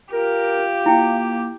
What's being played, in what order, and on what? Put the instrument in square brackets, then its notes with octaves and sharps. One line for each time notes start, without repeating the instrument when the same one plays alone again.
[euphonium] F4 [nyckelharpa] G4 [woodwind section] A#4
[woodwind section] A#3 [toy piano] E4 G5